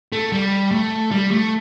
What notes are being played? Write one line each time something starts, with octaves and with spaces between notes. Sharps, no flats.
A3
G3
A3
G3
A3